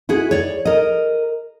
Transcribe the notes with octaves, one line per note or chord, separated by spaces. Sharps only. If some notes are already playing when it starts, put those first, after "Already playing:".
E4 F#4 G#4
C#5 D5
A#4 D#5